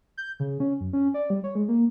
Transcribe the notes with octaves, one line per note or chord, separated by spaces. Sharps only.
G6
C#3
C#4
F#2
C#4
D5
G3
C#5
G#3
A#3